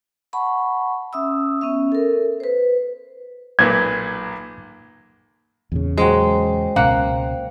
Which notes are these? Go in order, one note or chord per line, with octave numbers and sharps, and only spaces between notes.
F#5 A5 B5 C#6
C#4 E5 D#6 E6
B3 C#4 E5
A4 A#4
B4 C5
B1 A#2 B4 G#6
E2 A#2 C#3
F#3 G#3 C5 G5
C#2 B2 A#3 C#4 F#5